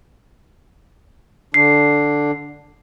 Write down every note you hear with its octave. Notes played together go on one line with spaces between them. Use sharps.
D3 D4 C7